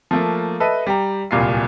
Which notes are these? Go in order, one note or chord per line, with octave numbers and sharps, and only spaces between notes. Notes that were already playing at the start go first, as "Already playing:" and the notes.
F3 A3 A#3
A4 B4 D#5 E5
G3 G5 A#5
D1 C2 A#2 F4 C7